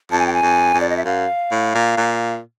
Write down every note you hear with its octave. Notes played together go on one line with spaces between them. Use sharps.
F2 A5
G#5
G5
G#5
F2
F2
D5
D#5
E5
F#2 F5
A2
A#2
A#2